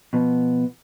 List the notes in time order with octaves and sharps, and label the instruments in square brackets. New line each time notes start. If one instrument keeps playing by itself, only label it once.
[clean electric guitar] B2 F3 B3